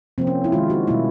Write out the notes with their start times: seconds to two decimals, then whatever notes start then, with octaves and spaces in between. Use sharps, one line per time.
0.18 C3 F3 A#3 C4
0.27 C#4
0.44 E4
0.52 D#3 G#3 F4
0.70 F#4
0.87 B2 G3 A#3 E4